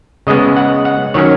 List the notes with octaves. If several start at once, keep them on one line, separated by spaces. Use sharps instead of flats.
C#3 G#3 B3 D#5
F#5
F#5
D#3 F#3 C#4 C#5